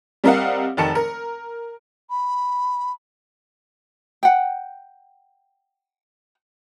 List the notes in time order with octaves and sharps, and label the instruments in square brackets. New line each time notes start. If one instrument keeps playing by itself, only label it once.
[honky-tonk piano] G3 C4 A#4 D#5 F5 F#5
F1 D#3 A5 C#7
A#4
[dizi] B5
[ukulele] F#5 G5